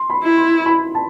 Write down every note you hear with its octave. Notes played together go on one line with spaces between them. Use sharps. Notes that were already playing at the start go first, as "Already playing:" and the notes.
Already playing: C6
B5
E4
C6
B5
A5